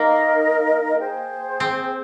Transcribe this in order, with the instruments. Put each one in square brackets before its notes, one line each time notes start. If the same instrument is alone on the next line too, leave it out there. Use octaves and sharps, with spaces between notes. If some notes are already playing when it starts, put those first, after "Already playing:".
Already playing: [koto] A#3 [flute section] D#4 A#4 D#5
[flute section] G#4 C5 G5
[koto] C4